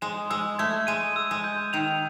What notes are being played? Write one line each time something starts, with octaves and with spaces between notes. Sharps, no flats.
G#3 E7
G#3 E6
A3 G#6
G#3 D#7
E6
G#3
G6
D#3 F7